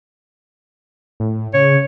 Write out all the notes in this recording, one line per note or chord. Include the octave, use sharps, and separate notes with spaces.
A2
C#3 C#5